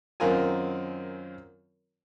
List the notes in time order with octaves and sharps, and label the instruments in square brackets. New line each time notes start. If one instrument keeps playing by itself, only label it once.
[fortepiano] F#2 D#3 C4 F4 A#4 G#5